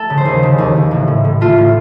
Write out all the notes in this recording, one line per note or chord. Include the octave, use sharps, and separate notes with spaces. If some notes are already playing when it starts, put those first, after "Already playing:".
Already playing: A3 A4
C#3
C5
D#2
C#3
D#2
D#2
A1
A2
A2
A3 F4
A2